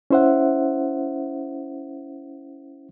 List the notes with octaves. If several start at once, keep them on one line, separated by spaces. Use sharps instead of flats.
C#4 E4 C5 E5 F#5